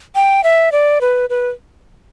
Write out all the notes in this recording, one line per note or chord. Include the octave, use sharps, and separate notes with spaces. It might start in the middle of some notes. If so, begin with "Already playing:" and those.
G5
E5
D5
B4
B4